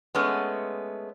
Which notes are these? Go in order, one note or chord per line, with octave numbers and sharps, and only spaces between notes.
G#3 A3 B3 C#4